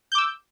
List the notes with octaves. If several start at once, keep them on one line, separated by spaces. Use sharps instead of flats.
D6 E6 G6